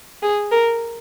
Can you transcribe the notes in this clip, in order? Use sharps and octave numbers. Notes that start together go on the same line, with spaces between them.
G#4
A#4